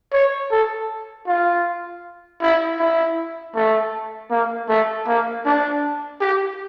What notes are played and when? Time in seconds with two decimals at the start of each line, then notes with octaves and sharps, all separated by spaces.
0.13 C#5
0.51 A4
1.27 F4
2.41 E4
2.79 E4
3.55 A3
4.31 A#3
4.69 A3
5.07 A#3
5.46 D4
6.21 G4